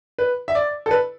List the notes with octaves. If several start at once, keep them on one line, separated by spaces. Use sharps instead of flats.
B4
E5
D5
A4
B4